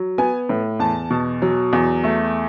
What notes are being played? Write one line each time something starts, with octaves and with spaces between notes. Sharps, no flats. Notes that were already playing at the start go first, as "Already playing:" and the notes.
Already playing: F#3
B3 G#5
A2
E2 A5
B2
F#3
E2
A3